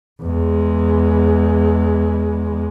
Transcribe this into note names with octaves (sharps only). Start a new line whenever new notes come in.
E2 G#3